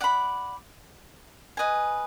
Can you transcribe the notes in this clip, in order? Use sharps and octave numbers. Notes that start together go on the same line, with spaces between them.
D5 F#5 B5
B4 D#5 G#5